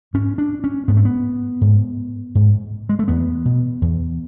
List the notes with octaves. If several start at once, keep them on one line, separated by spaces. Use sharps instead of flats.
G#2 C#4
D4
C#4
G#2 B3
A3
B3
G#2
G#2
G#3
A3
E2 B3
B2
E2